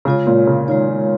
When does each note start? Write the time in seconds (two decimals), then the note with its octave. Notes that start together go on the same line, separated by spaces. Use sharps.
0.05 C#3 G#3 F4 C#5
0.27 A#2
0.47 C#3
0.68 D#3 G#3 F4 C#5
0.88 D#3